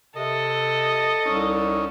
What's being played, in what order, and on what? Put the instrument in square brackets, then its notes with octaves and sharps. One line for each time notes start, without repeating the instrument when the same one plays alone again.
[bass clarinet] C3 [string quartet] A4 [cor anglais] D#5
[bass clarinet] C2 [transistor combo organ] C#4 D#4